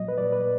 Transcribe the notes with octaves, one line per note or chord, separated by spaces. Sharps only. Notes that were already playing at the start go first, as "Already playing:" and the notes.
Already playing: A#2 F#3 D#5
B4
A#2 F#3 D5
B4